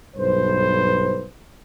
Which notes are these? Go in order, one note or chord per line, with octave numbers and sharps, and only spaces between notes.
B1 G2 A4 B4 C5